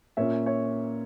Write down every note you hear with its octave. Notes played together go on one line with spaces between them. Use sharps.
A#2 A#3 C#4 C#5 E5
C#5 E5